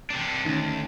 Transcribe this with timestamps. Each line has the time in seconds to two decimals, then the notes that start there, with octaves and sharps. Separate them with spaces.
0.10 C3 D4
0.45 D2 D#3 C#4